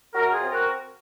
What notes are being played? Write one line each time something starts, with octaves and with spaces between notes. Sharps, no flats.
F#2 F#4 A#4
F4 G#4
C4
F#4 A#4